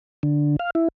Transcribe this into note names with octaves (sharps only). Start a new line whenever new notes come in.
D3
F5
E4